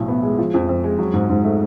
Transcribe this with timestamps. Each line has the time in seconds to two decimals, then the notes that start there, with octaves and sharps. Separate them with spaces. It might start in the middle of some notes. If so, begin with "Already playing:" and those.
Already playing: B1 A2 F3
0.08 B3
0.23 G#3
0.38 F3
0.54 F2
0.69 F2
0.84 G#3
0.98 F#3
1.14 G#2
1.30 G#2
1.44 A3